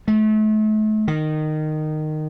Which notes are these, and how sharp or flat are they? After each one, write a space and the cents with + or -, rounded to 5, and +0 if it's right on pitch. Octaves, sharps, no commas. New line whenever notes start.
A3 -35
D#3 -15